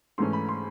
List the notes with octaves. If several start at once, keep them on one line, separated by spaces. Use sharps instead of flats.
G#2 E3 A3 C#4 C6
B5
C6